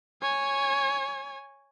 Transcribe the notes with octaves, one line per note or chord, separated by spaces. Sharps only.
C#5 G#5